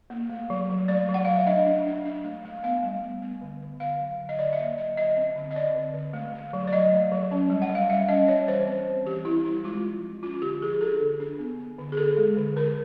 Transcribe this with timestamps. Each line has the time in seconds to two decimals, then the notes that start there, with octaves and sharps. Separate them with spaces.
0.10 A#3
0.30 A3
0.50 F#3
0.69 F#3
0.88 A3 D5
1.09 F#3
1.14 F#5
1.25 F#3 F5
1.36 E5
1.47 D4 D#5
1.66 D4
1.86 D4
2.05 D4
2.25 A3
2.45 A3
2.63 B3 F5
2.83 G3
3.03 B3
3.22 B3
3.41 D3
3.62 D3
3.80 D3 F5
3.99 F#3
4.19 D3
4.29 D#5
4.39 D3 D5
4.53 E5
4.58 A#3 D#5
4.78 F#3 D#5
4.97 D3 D#5
5.17 C4
5.36 D3
5.51 D#5
5.56 C4 D5
5.75 D3
5.94 D3
6.13 A3
6.34 A3
6.53 F#3
6.67 D5
6.72 F#3 D#5
6.92 A3
7.11 F#3
7.31 C#4
7.50 G3
7.62 F#5
7.70 G3
7.75 F5
7.89 G3 E5
8.08 C#4 D#5
8.28 G3 C#5
8.48 E3 C5
8.67 C4
8.87 G3
9.06 E3 G4
9.25 G3 E4
9.45 C4 E4
9.64 G#3 F4
9.83 F3
10.03 F3
10.22 C#4 F4
10.42 D3 G4
10.62 F3 G#4
10.81 D4 A4
11.01 D3
11.20 D4
11.39 B3
11.59 B3
11.78 D3
11.92 G#4
11.97 D3 A4
12.17 G#3
12.37 D3
12.56 D3 A#4